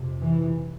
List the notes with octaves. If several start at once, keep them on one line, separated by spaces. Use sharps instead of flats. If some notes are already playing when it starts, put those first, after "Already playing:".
Already playing: F2 C3
E3